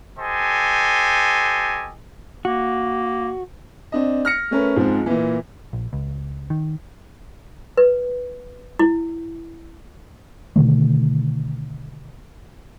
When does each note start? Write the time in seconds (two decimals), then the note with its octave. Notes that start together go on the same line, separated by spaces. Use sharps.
0.18 G4 A4 C5 D#5 G#5
2.45 A#3 F#4
3.92 C4 D4 D#5
4.25 F6 A#6 C#7
4.51 A3 C#4 A#4 B4
4.76 G#2 F3 G#3 C4
5.06 A#2 E3
5.73 A#1
5.93 C#2
6.50 D#3
7.77 B4
8.79 E4
10.56 B2 D3 D#3 A3